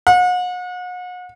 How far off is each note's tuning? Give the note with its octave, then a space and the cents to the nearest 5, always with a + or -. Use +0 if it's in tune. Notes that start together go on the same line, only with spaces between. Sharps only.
F#5 -40